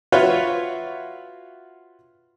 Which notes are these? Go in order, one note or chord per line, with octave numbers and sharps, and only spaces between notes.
F4 F#4 B4 C#5 E5